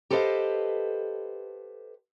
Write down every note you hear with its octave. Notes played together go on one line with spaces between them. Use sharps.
G4 A4 B4 C5 D#5 F5